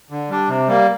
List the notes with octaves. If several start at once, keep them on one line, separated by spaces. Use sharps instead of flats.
D3
G3 D4
C3
G3 A#3